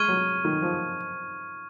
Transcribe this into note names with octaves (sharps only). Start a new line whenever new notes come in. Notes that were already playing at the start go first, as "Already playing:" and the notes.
Already playing: G#3 C#6 F6 G#6 D#7
F#3
D#3
F3